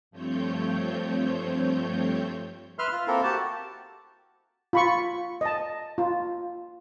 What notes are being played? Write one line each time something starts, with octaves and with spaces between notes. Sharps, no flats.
G2 F3 A3 C4 C#5 G6
B4 E5 C6 F6
F4
A#3 C4 E4 F4 A4 A#4
F#4 G4 A5
F4 B5 C#6
D#5 A5
F4